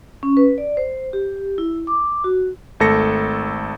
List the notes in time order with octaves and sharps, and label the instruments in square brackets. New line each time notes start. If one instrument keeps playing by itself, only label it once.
[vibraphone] C#4
B4
D5
C5
G4
E4
D6
F#4
[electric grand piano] G#1 A3 A4 A#6 C#7